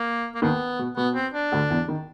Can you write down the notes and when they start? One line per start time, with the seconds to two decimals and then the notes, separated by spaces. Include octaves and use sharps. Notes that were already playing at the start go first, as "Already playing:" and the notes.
Already playing: A#3
0.35 A#3
0.42 D#2 D#3 B3
0.79 B2
0.96 B2 B3
1.15 C4
1.34 D4
1.52 D2 D3
1.70 E2 E3
1.88 D#3